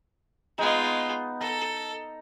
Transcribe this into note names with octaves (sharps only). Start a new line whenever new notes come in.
G#3 B3 D#4 F4
A4 A#5